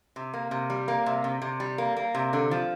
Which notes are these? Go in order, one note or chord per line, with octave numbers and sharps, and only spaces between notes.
C3
A#3
C3
G3
A#3
C3
C3
C3
G3
A#3
A#3
C3
D3
F3